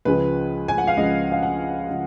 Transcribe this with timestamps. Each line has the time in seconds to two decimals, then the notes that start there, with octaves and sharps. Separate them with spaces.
0.05 C#2 C#3 F3 G#3 B4
0.68 G#5
0.78 F#5
0.87 F5
0.97 C#2 C#3 F3 G#3 D#5
1.32 F5
1.43 F#5
1.89 C#3 F3